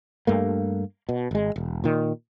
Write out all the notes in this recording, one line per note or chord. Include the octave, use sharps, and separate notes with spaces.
G2 A3 A#3
B2
G#1 G#3
E1
A#2 D#3